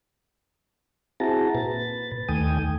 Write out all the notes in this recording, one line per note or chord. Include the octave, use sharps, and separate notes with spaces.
C4 E4 F#4 G#4 A5 A#5
A#2 B4 A6
D#2 D#3 A3 G5 G#5 D#6